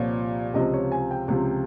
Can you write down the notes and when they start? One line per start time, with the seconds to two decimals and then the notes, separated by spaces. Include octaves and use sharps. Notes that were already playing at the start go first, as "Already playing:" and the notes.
Already playing: C2 A#2 F3 C#5
0.54 C#2 C3 F3 D#5
0.74 C#5
0.92 G#5
1.11 G5
1.28 C#2 C3 F3